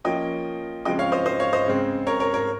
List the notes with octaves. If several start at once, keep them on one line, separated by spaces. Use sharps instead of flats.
F3 A#3 C#4 D#5 G5
C#3 F3 G#3 C4 D#5 G5
C#5 F5
C5 D#5
C5 D#5
C#5 F5
C5 D#5
C#3 G#3 C4
A#4 C#5
A#4 C#5
A#4 C#5